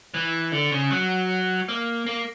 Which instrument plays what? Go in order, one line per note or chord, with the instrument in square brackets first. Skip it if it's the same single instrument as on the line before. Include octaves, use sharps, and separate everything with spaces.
[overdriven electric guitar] E3
D3
C#3
F#3
A#3
A#3